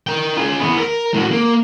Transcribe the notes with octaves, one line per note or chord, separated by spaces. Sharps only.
A#4 G5
F4 G#4
E2 B3
A#4
A2 F#4
A#3